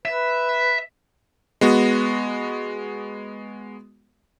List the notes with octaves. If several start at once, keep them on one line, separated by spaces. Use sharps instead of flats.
B4 E5
G#3 B3 F#4